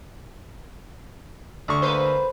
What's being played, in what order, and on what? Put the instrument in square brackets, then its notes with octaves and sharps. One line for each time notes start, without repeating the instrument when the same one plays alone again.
[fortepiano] D2 C#6
[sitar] A#3 B4 C5